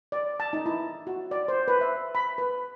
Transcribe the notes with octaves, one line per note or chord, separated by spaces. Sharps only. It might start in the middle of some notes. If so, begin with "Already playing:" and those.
D5
A5
D#4
E4
F#4
D5
C5
B4
E5
B5
B4